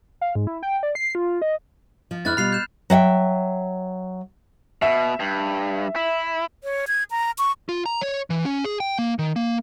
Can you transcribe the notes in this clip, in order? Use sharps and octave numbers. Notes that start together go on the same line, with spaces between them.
F5
G#2
E4
G5
D5
C7
F4
D#5
F3
F2 D4 E4 F6 F#6 A6
B2 G3 F4 B5 C7 F7
G6 C7 E7
F#3 E5 F#5 G5
B2 E5
G2
E4
C#5
G#6
A#5
C#6
F4
A#5
C#5
E3
C#4
G#4
G5
A#3
D#3
A#3